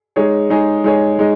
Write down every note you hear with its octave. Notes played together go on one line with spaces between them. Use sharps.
G#3 D#4 G#4 C#5
G#3 D#4 G#4 C#5
G#3 D#4 G#4 C#5
G#3 D#4